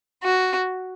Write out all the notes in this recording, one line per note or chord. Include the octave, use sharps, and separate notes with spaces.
F#4